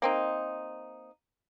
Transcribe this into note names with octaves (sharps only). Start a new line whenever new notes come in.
A#3 C4 D#4